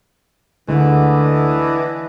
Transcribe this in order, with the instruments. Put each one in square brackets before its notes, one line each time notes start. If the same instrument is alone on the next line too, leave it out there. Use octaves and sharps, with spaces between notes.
[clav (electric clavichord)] D2 G#3 [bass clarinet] D3 [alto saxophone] E3 [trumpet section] D4 E4 D#5